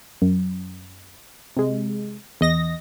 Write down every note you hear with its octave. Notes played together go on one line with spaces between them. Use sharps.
F#2
C3 G#3
E2 D#5 A#6